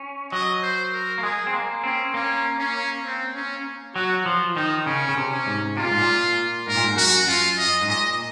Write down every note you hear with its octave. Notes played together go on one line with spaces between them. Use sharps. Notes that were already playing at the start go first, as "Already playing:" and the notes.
Already playing: C#4
F#3 D#5
C5
A#4
A#3
G#3 G#4
C4
A#3
C4 C#4
A#3 C#4
C#4
C4
C#4
F#3 F#4
F3 F4
D#3 D#4
C#3 C#4
C#3
C3
C#4
G#2
C3 F4
A#2
G#2
A#2
G#2 A#4
A#2
G#2
F#2 F#4
F#2 F4
D#5
G#2
A#2 D#5